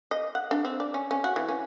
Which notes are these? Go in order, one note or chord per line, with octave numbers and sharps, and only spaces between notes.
D#5
F#5
D4
C4
D5
C#4
C#4
F#4
E3
C#4